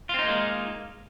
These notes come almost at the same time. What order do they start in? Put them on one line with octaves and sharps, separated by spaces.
F4 C4 D#4 A#3 G#3